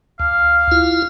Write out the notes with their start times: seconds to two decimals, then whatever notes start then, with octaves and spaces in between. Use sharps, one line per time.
0.20 D2 F5
0.72 E4 F4